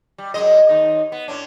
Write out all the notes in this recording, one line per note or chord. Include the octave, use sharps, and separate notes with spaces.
G3
F#2 G#3 D#5
D#2 D#4
B3
A2 C#4 D4